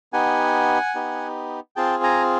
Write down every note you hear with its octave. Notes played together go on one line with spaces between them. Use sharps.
B3 D#4 G4 F#5 G#5
B3 D#4 G4
C4 F4 G#4 G5 A5
G#5 A#5